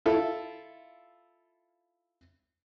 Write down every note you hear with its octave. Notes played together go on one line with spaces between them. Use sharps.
E4 F4 A4